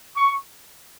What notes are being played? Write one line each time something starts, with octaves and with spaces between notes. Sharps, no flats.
C#6